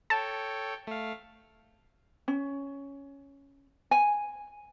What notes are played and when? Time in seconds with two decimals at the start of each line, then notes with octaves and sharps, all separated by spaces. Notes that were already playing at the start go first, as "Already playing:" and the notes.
0.10 A4 C#5 G5 A5
0.87 A3 F5
2.28 C#4
3.91 G#5